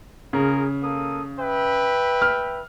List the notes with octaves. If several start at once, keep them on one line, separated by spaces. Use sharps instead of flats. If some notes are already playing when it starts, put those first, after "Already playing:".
C#3 F4 G#4 A#4
A#3 A4 D#6
B4 E5 G5
F6